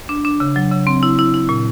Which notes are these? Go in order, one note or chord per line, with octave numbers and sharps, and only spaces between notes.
D4
D4
C#3
F#3
C#3
C4
E4
E4
E4
A#2